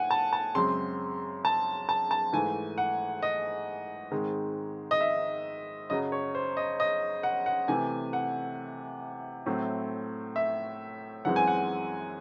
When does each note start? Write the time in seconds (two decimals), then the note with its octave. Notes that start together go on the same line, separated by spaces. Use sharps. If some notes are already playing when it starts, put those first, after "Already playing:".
Already playing: A2 F#5 G#5
0.11 A5
0.33 A5
0.55 F#2 C#3 G#3 C4 C6
1.45 A5
1.89 A5
2.11 A5
2.33 G#2 E3 A3 G#5
2.78 F#5
3.22 D#5
4.11 G#2 D#3 G#3 C4
4.91 D#5
5.01 E5
5.90 F#2 C#3 F#3 D#5
6.12 C#5
6.35 C5
6.57 D#5
6.80 D#5
7.23 F#5
7.46 F#5
7.68 C3 E3 A3 G#5
8.13 F#5
9.46 A2 F#3 A3 C4
10.36 E5
11.25 F#2 E3 G#3 C4 F#5
11.36 G#5
11.47 F#5